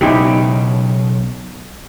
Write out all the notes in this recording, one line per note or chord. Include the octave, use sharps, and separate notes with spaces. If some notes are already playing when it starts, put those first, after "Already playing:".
B1 C#3 D#4 E4 G4